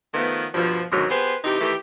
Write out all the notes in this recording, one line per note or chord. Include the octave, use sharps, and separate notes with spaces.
D#3 F3 A3 B3
G2 B2 F3
D2 G#2 B2 D#3 F#3
B3 G4 G#4 B4 C5
C3 E3 D#4 G4
D#3 E3 A3 G4